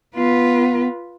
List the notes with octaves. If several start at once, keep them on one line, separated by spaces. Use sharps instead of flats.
B3 F4 B4